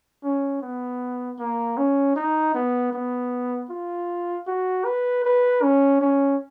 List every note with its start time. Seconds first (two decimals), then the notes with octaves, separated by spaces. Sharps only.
0.23 C#4
0.62 B3
1.39 A#3
1.77 C#4
2.16 D#4
2.54 B3
2.93 B3
3.70 F4
4.47 F#4
4.85 B4
5.24 B4
5.62 C#4
6.01 C#4